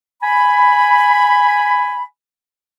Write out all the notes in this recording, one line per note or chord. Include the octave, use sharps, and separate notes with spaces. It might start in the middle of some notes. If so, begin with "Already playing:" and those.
G#5 B5